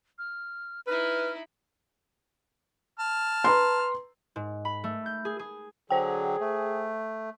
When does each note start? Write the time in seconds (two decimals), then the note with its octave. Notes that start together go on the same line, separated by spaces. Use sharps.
0.19 F6
0.87 D#4 E4 B4 F6
2.99 A5 F6
3.44 B4 A#5 C6
4.36 G#2
4.65 B5
4.84 A3
5.06 G6
5.25 G#4
5.39 G#4
5.90 D3 F#3 G#4 C5 G5
6.41 A3